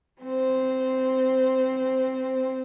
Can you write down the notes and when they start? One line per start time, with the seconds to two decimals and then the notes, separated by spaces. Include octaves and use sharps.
0.22 C4 C5